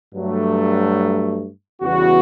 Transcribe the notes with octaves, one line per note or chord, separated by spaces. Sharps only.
G2 F#3 A3
E2 C#3 E3 G3 B3 F#4